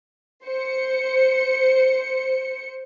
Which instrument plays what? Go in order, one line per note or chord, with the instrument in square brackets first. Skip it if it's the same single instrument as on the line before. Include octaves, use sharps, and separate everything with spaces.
[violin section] C5 C#7